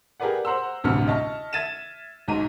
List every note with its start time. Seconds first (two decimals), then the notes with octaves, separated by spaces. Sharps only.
0.20 G4 G#4 A#4 B4 D5 F#5
0.45 C5 F#5 A#5 C6 E6
0.84 A1 D2 G2 C3 F6 C#7
1.07 D#5 E5 A5 C#6 F6
1.53 E5 G#6 A6 D#7 E7
2.28 B1 G#2 A#5 D#7